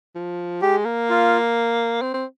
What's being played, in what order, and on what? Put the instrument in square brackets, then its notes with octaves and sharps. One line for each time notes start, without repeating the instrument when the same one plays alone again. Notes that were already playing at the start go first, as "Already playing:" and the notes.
[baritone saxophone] F3
[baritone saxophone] G#3 [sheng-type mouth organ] G4
[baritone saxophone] A#3
[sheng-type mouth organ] F4
[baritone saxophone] C4
C4